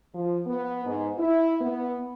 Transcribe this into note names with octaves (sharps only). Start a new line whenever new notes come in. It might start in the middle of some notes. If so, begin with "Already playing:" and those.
F3
B3
G#2
E4
B3